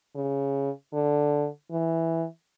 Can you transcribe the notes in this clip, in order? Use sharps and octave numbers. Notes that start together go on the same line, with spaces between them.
C#3
D3
E3